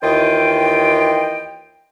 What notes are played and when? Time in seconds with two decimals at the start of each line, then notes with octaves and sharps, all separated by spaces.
0.02 D#2 E3 F4 D#5 G5